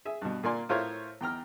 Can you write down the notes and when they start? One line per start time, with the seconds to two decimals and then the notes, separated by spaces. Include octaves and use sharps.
0.05 G#4 E5
0.22 G2 B2
0.43 A#2 A#3 D5 G#5 C6
0.69 A2 F4 A#4 C5 C#5 E5
1.21 E2 G5 A#5 F6